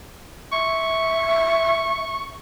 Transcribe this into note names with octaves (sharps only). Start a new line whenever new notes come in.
E5 C#6